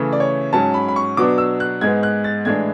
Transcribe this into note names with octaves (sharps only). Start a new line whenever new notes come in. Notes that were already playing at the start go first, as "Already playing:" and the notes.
Already playing: C#3 E3 A3
D5
C#5
G#2 F#3 C#4 A5
B5
B5
C#6
B2 F#3 B3 D4 D6
E6
F#6
G#2 G#3 B3 G#6
F#6
A6
A2 E3 G#3 D4 G#6